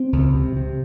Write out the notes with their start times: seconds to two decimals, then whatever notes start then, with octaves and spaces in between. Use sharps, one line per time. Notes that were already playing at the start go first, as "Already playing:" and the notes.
Already playing: C4
0.13 C#2
0.34 C3
0.57 C3